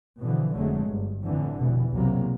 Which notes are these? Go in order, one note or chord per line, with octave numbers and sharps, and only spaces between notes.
B2 D3 E3 F3
F1 D3 F#3 G#3 A3
G1 G2
F2 A2 D3 E3
F1 B2 E3
B1 E2 C3 F#3 A#3